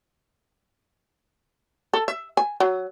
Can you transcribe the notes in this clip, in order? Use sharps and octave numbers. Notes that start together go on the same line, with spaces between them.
A4
E5
G#5
F#3